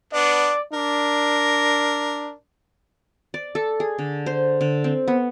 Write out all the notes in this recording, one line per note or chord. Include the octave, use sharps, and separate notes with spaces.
B3 D4 D5
D4 A#4
D5
A4
G#4
D3
C5
D3
C4
B3